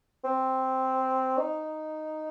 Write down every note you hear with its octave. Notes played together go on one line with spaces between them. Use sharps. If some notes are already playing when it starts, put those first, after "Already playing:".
C4
D#4